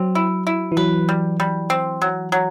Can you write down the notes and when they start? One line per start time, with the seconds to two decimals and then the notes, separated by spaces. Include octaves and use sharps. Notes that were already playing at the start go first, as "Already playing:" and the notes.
Already playing: F#3 C4
0.15 E4
0.47 E4
0.72 E3
0.77 F#3 B4
1.09 G3
1.40 G3
1.70 C4
2.02 F#3
2.32 F#3